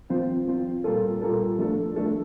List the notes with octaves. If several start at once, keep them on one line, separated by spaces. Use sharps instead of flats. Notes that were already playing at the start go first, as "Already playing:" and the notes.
F3 C4 F4 C5
F3 C4 F4 C5
A#2 G3 A#3 F4 A4
A#2 G3 A#3 F4 A4
F3 A3 D4 A4
F3 A3 D4 A4